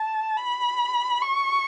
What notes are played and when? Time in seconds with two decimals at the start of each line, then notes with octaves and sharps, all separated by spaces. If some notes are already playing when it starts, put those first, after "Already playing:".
Already playing: A5
0.37 B5
1.22 C#6